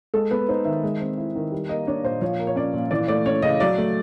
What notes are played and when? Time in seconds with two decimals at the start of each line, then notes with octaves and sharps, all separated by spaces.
0.14 G#3 A4
0.31 B3 B4
0.48 D#4 C5
0.65 D#3 E5
0.84 G#3
1.00 C4
1.18 E4
1.35 D#3
1.52 G3
1.69 A#3 D#5
1.87 D4 C#5
2.04 A#2 C5
2.21 F3 C#5
2.39 A#3
2.47 C#5
2.56 C#4 D5
2.74 A#2
2.91 E3 D5
3.08 A3 D5
3.25 C#4 C#5
3.42 C#3 D#5
3.60 F#3 D5
3.78 A3